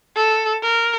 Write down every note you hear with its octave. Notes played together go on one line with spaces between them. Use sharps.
A4
A#4